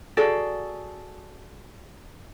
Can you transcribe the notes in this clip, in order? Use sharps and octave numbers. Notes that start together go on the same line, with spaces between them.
F#4 G#4 A4 D5